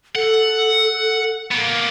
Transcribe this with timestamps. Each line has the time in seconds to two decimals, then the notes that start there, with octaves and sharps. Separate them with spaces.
0.16 A4 F#5
1.52 A#3 B3